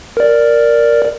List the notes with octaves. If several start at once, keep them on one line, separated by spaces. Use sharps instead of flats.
A#4 D5